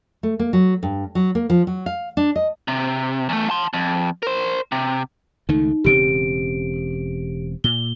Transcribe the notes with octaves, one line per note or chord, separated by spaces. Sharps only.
A3
A#3
F#3
G2
F#3
A#3
F3
F#3
F5
D4
D#5
C3
E2 A3
A5 C6
F2
A#4 C5
C3
C#2 D#3 A3 D#4
E1 C#3 C4 G4 D7
A#2 G7